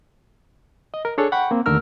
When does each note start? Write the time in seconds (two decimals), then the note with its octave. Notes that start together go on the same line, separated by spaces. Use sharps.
0.94 D#5
1.05 A#4
1.18 D4 G#4 A4 C#5
1.32 F#5 G5 B5 C#6
1.51 A#3 C4
1.66 D#2 D3 A3 A#4 E6 F6